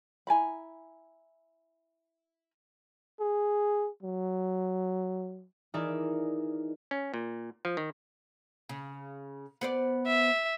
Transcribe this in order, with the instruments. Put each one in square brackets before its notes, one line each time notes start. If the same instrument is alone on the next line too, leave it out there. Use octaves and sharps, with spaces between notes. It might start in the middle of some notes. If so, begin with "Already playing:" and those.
[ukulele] E4 G#5 A#5 B5
[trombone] G#4
F#3
[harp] E3 D#4 G#4 A#4 D5 E5
[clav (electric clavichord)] C#4
A#2
F3
D#3
[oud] C#3
B3 C5 D5
[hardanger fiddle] E5